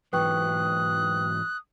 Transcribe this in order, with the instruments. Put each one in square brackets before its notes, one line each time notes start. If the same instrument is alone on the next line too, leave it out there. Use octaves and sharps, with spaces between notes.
[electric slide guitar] G#2 E3 F#3 [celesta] B4 G5 C#6 [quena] D#6 [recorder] F#6